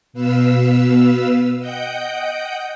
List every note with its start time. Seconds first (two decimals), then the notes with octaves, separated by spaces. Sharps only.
0.13 B2 B4 F5 E6
1.58 D#5 F#5 G5 G6